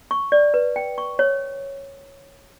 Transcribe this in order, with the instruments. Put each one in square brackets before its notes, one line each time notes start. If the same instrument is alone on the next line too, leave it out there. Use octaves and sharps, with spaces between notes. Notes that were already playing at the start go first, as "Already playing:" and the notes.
[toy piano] C#6
D5
B4
G5
C#6
C#5